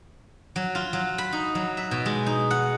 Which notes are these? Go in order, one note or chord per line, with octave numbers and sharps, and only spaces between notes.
F#3
F4
F#3
B5
D#4
F#3
E5
B2
G#3
D#4
F#5